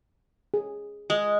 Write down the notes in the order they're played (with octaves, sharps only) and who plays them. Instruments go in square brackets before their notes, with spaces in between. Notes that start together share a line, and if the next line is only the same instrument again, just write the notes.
[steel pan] G#4
[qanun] G#3